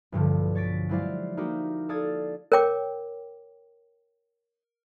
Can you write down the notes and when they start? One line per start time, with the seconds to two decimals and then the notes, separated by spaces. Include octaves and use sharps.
0.12 B1 G2 D3 F3
0.55 C#5 A6 B6 D7
0.89 F#3 G#3 E4 C5 D5 F5
1.37 A#3 D#4 E4 F#4 G4
1.89 A4 D5 F5 D#6 E6 G#6
2.52 A#4 C#5 G5 D6